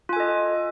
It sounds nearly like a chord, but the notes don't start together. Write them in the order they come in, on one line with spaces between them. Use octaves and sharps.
F4 G#5 A4 D#5